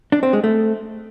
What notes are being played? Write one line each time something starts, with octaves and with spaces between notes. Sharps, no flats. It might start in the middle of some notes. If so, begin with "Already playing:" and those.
D4
C4
G#3
A3